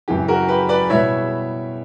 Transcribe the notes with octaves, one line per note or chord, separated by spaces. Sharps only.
F#2 C#3 E3 G4
F#4 A#4
G4 B4
B4 D5
B2 G3 B3 E4 C#5 E5